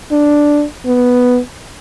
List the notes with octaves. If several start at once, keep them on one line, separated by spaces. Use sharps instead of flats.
D4
B3